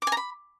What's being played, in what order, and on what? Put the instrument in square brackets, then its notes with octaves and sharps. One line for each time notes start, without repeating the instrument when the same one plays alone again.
[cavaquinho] D6
G#5
A#5
B5